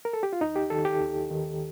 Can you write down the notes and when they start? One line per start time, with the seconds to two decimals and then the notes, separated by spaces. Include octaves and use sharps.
0.05 A#4
0.13 A4
0.23 G4
0.33 F4
0.41 D#2 D#4
0.56 G4
0.70 D#3 A4
0.85 G4
1.00 D#2
1.30 D#3